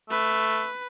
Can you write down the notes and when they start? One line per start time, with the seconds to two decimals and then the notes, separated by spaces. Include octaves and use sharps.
0.10 A3 B4